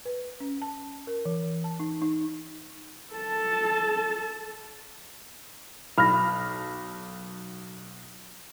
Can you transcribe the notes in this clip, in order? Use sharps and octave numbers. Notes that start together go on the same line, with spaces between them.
B4
C#4
A5
A#4
E3
A5
D#4
D#4
A4 A5
B1 B5 F6 A#6